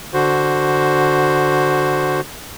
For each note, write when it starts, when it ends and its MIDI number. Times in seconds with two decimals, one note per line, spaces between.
0.14 2.21 50
0.14 2.21 66
0.14 2.21 72